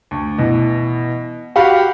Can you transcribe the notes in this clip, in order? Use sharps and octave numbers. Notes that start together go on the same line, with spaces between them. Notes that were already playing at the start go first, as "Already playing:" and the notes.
D2
B2 E3
F#4 G4 F5 B5